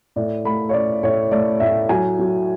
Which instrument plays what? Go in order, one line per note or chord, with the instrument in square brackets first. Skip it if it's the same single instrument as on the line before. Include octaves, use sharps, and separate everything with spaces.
[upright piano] A2 D5
A3 B5
C#5
C#4 D5
A2 C#5
A3 D5
A2 E5
F#3 G#5
F#3